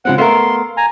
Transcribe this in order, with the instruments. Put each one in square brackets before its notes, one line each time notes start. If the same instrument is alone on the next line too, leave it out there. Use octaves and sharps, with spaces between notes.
[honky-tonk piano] C#3 G#3 C4 [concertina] F#5
[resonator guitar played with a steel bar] A3 B3 A#4 [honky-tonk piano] F5 [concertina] C6
[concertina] G#5 A#5